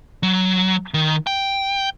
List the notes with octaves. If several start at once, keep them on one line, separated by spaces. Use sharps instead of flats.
F#3
D#3
G5